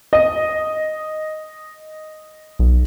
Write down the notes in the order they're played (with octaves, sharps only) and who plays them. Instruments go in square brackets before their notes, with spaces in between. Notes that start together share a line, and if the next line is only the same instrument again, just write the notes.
[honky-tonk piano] D#5
[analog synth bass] B1